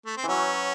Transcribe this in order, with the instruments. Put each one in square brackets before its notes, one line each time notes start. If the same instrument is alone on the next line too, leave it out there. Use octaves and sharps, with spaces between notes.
[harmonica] A3
C4
[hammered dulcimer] E3 F#3 [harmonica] C#4